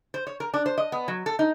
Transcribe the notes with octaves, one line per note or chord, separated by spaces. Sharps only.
C5
C#5
A#4
D4
C5
D#5
B3
F#3
A4
D#4